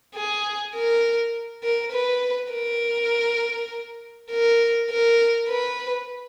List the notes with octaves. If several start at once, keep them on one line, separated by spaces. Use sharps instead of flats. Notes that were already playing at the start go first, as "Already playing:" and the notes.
G#4
A#4
A#4
B4
A#4
A#4
A#4
B4